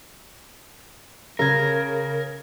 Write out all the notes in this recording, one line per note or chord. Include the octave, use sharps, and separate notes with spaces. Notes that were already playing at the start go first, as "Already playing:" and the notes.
C#3 A#4 G#6